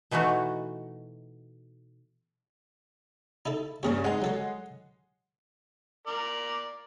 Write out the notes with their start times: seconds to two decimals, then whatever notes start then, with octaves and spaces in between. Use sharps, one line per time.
0.11 B2 E3 A3 D#4 F#4
3.46 D#4 E4 A4
3.83 G2 C#3 C#4 G4 G#4 C#5
4.04 G#3 C4 D#4 G#4 F#5
4.22 F#3 A4 C#5
6.07 A#4 D5